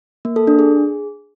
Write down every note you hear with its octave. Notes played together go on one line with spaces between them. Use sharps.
A#3
A4
D4
G#4